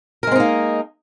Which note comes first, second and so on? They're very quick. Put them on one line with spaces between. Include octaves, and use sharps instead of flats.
A#4 G#3 C4 D#4 A#3